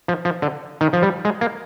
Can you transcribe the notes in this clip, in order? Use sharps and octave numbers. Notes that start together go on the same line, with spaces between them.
F3
F3
D3
D#3
F3
G3
G#3
A#3